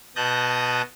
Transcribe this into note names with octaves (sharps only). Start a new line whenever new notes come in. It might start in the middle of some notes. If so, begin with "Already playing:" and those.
B2 A5 D#6 F#6 G6 A#6